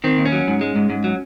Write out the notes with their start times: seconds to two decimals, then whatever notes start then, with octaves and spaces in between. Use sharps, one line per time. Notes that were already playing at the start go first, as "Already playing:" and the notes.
0.04 D#3 C4
0.18 D#2
0.26 C#4
0.32 F#3
0.48 G#2
0.61 G#3
0.75 G#2
0.90 G#2
1.04 F#3